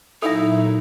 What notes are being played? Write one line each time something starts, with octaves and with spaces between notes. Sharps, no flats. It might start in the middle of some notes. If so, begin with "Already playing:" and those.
A#2 F#3 D#4 E4 A4 E5